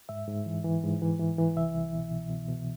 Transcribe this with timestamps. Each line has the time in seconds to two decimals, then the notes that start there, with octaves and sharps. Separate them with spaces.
0.09 G#2 E5
0.28 G#2
0.46 E3
0.64 E3
0.83 G#2
1.02 E3
1.20 E3
1.38 E3
1.56 C2 E5
1.74 C2
1.94 B2
2.11 B2
2.30 B2
2.49 B2